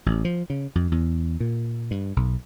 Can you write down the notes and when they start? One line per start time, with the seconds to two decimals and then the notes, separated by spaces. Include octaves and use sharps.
0.06 A1
0.25 F3
0.50 C#3
0.75 F2
0.92 E2
1.40 A#2
1.91 G2
2.16 B1